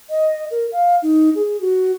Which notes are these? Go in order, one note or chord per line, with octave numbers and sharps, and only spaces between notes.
D#5
A#4
F5
D#4
G#4
F#4